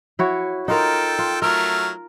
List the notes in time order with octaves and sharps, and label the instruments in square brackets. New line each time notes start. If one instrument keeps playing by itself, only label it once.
[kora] E4 F#4 C#5
[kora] D#4 F4 A#4 [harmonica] A4 G5
[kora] F4
[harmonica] F#3 A3 F6 [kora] A#4